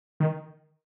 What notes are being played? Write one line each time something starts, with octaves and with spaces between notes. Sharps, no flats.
D#3